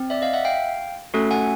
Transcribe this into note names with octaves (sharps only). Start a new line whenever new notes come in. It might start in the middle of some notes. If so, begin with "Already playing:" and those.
Already playing: C4
D5 E5
D#5 F5
E5 F#5
F5 G5
A3 C#4 F#4 A4
F#5 G#5